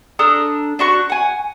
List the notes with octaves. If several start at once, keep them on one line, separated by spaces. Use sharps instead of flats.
D4 A4 A#5 D#6
D4 F#4 C#6
F#5 G#5